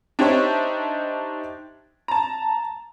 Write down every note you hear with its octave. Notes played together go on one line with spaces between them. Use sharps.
D4 D#4 G4 C5 C#5 E5
A5 A#5